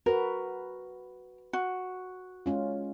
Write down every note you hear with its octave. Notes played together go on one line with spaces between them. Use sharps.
F#4 A#4 B4
F#4
G#3 C#4 F4